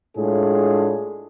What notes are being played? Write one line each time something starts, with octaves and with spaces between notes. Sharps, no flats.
A2 G#3 D4 F4 G#4